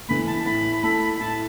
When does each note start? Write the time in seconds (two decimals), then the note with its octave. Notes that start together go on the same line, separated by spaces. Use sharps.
0.08 E3 A3 B5
0.27 A5
0.46 A2 B5
0.82 A3 E4 A4 B5
1.20 A2 A5